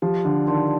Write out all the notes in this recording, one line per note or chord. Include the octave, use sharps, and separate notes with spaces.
F3 G4
D3
D#3 D5 A5 C6